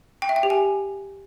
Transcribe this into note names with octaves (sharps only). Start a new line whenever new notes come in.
G5
E5
G5
G4
G#5